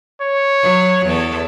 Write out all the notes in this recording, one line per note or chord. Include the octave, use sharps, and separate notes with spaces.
C#5
F#3
E2 A4